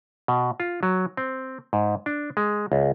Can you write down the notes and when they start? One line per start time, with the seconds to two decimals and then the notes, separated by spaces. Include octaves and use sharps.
0.28 B2
0.60 F4
0.83 F#3
1.17 C4
1.73 G#2
2.06 D4
2.37 G#3
2.72 C#2